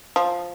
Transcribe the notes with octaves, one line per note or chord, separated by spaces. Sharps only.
F3